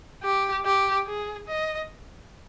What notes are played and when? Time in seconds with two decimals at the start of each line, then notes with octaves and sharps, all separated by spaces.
0.23 G4
0.66 G4
1.07 G#4
1.48 D#5